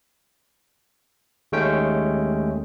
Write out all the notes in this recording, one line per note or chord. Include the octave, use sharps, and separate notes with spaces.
D#2 G#3 A3 C#4 G5